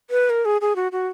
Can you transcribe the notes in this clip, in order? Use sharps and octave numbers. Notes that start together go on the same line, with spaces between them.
B4
A#4
G#4
G#4
F#4
F#4